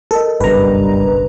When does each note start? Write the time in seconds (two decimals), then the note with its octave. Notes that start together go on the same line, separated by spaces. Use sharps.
0.11 A4 A#4 D#5
0.40 F#1 B1 G2 B4 A#5